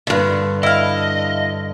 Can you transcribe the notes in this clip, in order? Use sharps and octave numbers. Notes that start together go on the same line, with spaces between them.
G2 D3
E4 D#5 F5